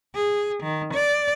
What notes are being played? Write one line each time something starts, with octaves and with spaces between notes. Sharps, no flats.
G#4
D#3
D5